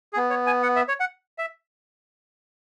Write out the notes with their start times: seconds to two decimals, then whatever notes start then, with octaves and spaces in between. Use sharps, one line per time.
0.13 G#4
0.17 B3
0.30 C#5
0.47 G#5
0.63 F#5
0.76 E5
0.88 C#5
1.00 F#5
1.38 E5